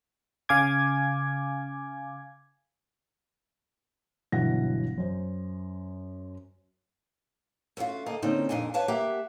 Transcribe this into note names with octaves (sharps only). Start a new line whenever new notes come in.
C#3 F5 G#5 D6 G#6
G1 B2 E3 F#3 F#5 A#6
F#2 C5
A3 B3 C#4 F4 F#4
D2 A#3 A4 D#5
D3 A#3 C4 C#4 D#4
F2 A#2 D4 D#5 G#5
B4 C#5 F5 A5
A#3 G4 E5 F#5